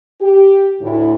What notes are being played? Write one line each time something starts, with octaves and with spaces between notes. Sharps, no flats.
G4
D2 A2 E4